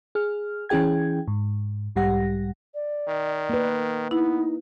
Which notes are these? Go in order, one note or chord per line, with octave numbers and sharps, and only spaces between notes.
G#4 F6
E3 C#4 E4 G#4 G5 G#6
G#2
B1 G#2 G3 G4 F#5 A#6
D5
D#3
A#3 B4
B3 D#4 E4